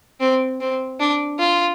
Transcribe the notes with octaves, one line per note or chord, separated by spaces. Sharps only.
C4
C4
D4
F4